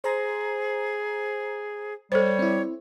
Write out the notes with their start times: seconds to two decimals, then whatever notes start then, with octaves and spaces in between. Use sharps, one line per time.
0.04 G#4 C5 A#5
2.12 G3 A4 C5 C#5
2.39 C4 E4